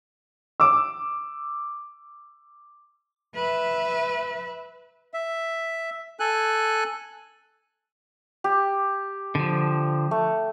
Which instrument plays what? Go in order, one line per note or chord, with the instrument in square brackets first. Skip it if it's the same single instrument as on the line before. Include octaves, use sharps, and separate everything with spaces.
[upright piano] D6 E6
[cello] B4 E5
[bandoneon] E5
A4 G#5 F#6
[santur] G4
[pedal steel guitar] D3 F3
[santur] A3